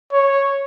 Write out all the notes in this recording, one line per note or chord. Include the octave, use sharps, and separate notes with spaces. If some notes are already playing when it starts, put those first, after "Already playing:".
C#5